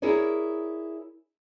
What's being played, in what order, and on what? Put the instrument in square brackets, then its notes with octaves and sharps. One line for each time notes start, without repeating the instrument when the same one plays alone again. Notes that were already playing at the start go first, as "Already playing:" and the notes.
[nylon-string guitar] E4 G#4 A#4 C#5 D5